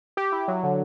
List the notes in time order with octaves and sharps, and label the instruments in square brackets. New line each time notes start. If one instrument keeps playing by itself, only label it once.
[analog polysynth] G4
E4
F#3
D3